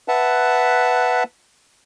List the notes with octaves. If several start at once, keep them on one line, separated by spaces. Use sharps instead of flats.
B4 E5 F#5 A5